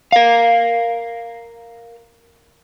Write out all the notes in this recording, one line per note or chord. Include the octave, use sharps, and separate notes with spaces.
A#4 F5